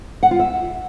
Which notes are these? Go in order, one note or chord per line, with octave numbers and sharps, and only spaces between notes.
F#5
F4
E5